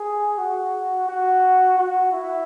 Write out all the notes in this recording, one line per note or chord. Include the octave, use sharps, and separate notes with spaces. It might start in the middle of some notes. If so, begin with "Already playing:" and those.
Already playing: G#4
F#4
F#4
F#4
E4